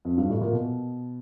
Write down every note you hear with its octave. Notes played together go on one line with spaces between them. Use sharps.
F2
G2
A2
A#2
B2